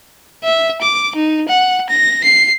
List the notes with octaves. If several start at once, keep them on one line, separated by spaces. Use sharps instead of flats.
E5
D6
D#4
F#5
A#6
C7